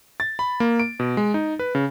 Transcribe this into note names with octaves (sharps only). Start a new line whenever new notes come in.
A6
B5
A#3
D7
B2
G#3
D#4
B4
C#3